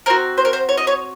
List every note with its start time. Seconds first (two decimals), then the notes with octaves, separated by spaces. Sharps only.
0.06 C4 F#4 A#4
0.38 C5
0.45 A#4
0.53 C5
0.69 C#5
0.78 D#5
0.87 C#5